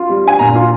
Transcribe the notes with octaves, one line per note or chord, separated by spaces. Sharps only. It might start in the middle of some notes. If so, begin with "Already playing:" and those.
Already playing: F4
G3
D4 G#5
A#2 A#5
F4